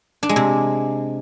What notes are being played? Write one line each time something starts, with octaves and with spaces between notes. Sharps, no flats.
D4
G#3
C3